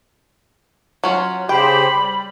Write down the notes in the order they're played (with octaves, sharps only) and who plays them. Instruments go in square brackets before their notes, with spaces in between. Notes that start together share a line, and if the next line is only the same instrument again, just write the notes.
[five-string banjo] F#3 C#4 F4
[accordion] C#3 G4 C5 [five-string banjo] G5 [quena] B5
[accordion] G3